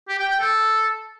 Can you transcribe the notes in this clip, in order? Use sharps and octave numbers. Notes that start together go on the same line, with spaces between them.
G4
G5
G5
A4